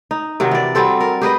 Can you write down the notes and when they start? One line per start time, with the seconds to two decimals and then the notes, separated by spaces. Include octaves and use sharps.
0.11 D#4
0.40 C3 D#3 F#3
0.51 E3 D5
0.75 F#3 G3 C4 A4
1.00 A#4
1.21 G4 G#4 B4 D#5